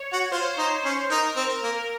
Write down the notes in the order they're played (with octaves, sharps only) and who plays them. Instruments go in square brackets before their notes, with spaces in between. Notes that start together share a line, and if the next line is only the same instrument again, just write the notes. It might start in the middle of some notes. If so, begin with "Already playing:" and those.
Already playing: [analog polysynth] C#5
[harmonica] F#4
[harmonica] F4 [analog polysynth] C5
[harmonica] D#4
C#4
[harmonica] D#4 [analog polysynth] A#4
[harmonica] C4
[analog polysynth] A#4
[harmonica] A#3